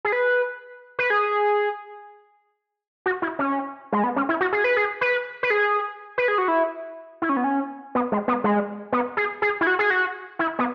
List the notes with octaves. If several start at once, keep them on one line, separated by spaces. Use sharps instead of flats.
G#4
B4
B4
G#4
F#4
E4
C#4
G#3
B3
C#4
E4
F#4
G#4
B4
G#4
B4
B4
G#4
B4
G#4
F#4
E4
E4
C#4
B3
C#4
B3
G#3
B3
G#3
B3
G#4
G#4
E4
F#4
G#4
F#4
E4
B3